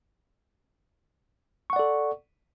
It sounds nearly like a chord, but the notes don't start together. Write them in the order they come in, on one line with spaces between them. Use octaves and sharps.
C#6 F#5 D5 A4